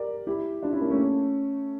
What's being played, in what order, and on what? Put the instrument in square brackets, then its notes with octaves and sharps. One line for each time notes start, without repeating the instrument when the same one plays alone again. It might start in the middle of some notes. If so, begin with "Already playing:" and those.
Already playing: [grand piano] G4 A#4 D5
E4 G4
D4 F4
C#4 E4
A#3
A3 C#4